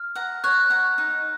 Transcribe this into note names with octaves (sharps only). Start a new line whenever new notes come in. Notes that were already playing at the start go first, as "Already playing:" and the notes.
Already playing: F6
F#5 A#5
C#5 F#6
F#5 A#5
D#4